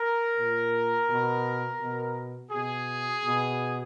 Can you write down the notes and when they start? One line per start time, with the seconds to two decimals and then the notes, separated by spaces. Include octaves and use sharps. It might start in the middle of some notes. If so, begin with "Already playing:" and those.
Already playing: A#4
0.37 A#2
1.09 B2
1.80 B2
2.51 B2 G#4
3.23 B2